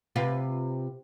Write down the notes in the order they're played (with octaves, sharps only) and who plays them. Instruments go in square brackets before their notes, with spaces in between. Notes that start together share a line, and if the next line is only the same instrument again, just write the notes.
[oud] C3 F4 B4